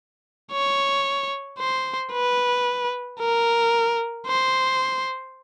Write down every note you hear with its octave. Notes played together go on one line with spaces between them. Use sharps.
C#5
C5
B4
A#4
C5